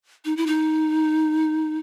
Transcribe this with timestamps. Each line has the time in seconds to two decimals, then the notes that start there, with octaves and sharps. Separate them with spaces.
0.25 D#4
0.37 E4
0.47 D#4